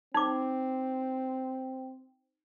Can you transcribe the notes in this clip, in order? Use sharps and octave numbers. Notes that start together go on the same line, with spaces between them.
C4 D#4 D6